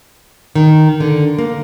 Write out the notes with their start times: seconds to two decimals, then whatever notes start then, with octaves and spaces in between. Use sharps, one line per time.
0.55 D#3
1.00 D3
1.38 A#3